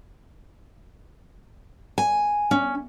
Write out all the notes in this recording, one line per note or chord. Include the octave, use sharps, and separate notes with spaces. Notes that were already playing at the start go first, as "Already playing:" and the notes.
G#5
C#4